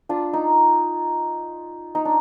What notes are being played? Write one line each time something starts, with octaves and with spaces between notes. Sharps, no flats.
D4 F4
D#4
D#4
D4